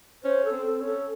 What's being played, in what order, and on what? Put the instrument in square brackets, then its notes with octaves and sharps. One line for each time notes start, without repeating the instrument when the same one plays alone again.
[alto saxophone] C#4 [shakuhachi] C5
[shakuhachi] A4
[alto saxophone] C4
[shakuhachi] A4
[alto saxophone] C#4
[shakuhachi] A4